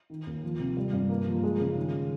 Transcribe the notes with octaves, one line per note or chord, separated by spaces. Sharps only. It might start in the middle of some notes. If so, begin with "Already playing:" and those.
D#3
D#2
F3
C3
G3
G2
A#3
F3
G#3
C#3
D#3